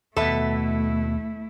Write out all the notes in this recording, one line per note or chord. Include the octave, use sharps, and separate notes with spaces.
D#2 B2 A3 B3 E4 A4 B4 E5